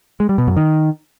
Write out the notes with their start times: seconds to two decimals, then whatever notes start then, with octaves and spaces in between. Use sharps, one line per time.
0.20 G#3
0.29 G3
0.38 B2
0.47 F#2
0.57 D#3